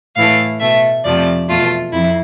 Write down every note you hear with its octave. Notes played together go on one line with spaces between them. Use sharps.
A2 E3 A3 F5
B2 A3 E5
F2 C3 F3 A3 D5
E2 B2 A3 F4
F2 E4